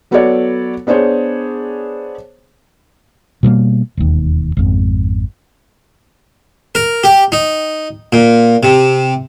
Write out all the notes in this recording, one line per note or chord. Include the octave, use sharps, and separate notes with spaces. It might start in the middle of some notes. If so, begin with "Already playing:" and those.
F#3 B3 F#4 A4 C#5 D5
B3 D4 G#4 C5 C#5
B2 G3 A3 A#3
E1 D#2
G#1 F2
A#4
G4
D#4
A#2
C3